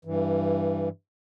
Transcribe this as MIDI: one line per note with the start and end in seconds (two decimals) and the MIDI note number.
0.05 0.89 43
0.05 0.89 52